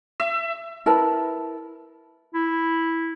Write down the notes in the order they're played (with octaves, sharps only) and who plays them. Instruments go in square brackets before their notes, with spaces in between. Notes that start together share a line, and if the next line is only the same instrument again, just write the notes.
[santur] E5
[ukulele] E4 A#4 B4 A5
[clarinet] E4